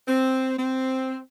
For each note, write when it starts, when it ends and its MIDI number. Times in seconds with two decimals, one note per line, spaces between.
0.07 0.55 60
0.57 1.18 60